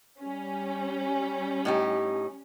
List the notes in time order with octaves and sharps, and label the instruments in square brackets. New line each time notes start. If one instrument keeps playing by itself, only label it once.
[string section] G3 C#4
[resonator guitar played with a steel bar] A2 D#4 G4